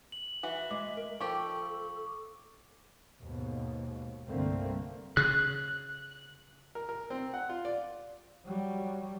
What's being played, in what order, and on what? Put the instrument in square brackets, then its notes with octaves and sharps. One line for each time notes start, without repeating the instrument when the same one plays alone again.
[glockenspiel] F#7
[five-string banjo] E3 F#4 [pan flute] E5
[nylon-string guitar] G#3 [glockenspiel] D6
[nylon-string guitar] A#4
[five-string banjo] F3 G4 [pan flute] A4 [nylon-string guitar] G5 [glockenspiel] C#6
[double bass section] D#2 G#2 B2
C2 G2 D3 A3 A#3 C4
[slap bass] C#3 [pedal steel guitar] F#6
[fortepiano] A#4
A#4
C4
F#5
F4
D5
[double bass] F#3 G3